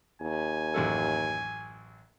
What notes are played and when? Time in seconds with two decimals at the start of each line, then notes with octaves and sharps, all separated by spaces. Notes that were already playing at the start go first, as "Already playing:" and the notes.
0.22 D#2 G#5
0.74 A1 F#2 A4